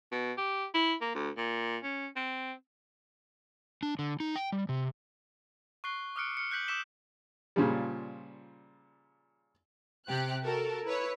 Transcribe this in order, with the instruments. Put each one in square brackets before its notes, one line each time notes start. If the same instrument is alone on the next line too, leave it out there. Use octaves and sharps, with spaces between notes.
[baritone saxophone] B2
G4
E4
A#3
D2
A#2
C#4
C4
[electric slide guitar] D4
D3
D#4
G5
G3
C3
[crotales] C#6 F#6 C7 G7
D6 D#6 F6 F#6 C#7 D7
F6 C#7
F#6 G6 B6 F#7
D6 E6 G6 B6 E7 G7
[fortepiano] A#2 C#3 F3 G3
[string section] C3 G4 F#6
F#4 A4 A#4
E4 B4 C#5